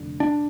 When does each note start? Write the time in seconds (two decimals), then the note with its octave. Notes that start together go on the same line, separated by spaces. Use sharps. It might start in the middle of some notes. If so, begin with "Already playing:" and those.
Already playing: F1 F2 D3
0.20 D4